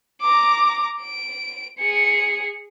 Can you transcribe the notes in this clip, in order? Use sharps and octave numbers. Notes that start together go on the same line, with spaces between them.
A#5 D6
D7
G#4 C#7